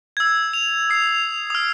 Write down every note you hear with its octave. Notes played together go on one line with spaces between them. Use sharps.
E6 G#6
F7
D#6 C7
D#6 F6